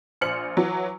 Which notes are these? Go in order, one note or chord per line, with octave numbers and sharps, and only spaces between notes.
A#1 C5 F6 C#7 F#7
E3 F#3